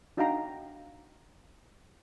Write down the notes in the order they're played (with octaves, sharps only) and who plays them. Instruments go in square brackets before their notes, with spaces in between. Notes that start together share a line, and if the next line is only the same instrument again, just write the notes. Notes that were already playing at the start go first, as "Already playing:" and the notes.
[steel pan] D4 D#4 F#4 F5 G5 A#5